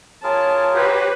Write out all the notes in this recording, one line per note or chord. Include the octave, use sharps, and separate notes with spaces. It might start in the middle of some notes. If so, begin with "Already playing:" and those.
F4 G#4 A#4 C#5 A5
F#4 G4 B4 C5